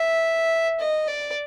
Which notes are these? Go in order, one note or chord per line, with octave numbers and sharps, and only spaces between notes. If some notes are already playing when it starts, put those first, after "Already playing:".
Already playing: E5
D#5
D5